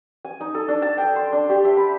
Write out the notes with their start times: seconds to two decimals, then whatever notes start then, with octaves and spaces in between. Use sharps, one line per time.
0.25 G#5
0.41 D#4
0.55 A4
0.68 D4
0.82 A5
0.98 G5
1.16 C6
1.33 D4
1.49 G4
1.65 E5
1.77 B5